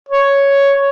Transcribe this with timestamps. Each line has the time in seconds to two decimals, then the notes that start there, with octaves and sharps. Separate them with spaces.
0.09 C#5